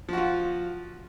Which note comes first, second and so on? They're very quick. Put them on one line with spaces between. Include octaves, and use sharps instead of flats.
F3 F#4 F4